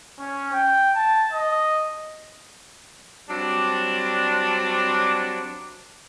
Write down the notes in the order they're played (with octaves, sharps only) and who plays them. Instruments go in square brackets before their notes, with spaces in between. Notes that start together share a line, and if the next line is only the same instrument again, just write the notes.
[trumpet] C#4
G5
A5
D#5
[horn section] F#3 G3 C4 D4